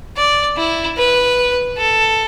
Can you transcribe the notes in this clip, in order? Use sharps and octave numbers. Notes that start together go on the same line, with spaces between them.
D5
E4
B4
A4